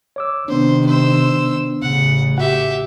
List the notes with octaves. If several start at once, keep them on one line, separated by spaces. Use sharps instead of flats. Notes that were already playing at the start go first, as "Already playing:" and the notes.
C#5 D6 E6
C3 D#3 B3 D4 C5
C5 E6
A1 C#3 F#5
F#4 G4 E5 F#5